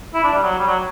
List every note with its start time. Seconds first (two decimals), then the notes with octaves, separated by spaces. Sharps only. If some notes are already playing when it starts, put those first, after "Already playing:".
0.14 E4
0.24 D4
0.33 G3
0.43 F#3
0.58 G3
0.67 F#3